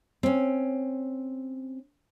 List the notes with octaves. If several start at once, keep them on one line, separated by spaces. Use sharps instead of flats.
C4 C#4